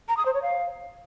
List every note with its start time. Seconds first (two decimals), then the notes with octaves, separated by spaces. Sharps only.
0.09 A#5
0.17 D#6
0.26 C5
0.34 C#5
0.43 F5